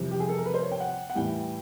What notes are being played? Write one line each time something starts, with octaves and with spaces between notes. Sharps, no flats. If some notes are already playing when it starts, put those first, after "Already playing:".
Already playing: F2 C3 E3 G3
G4
G#4
A4
A#4
B4
C5
C#5
G5
F#5
F#5
A2 E3 G3 G5